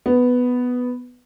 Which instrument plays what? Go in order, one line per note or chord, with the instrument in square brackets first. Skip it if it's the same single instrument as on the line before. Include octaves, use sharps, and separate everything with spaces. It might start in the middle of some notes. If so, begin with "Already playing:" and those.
[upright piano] B3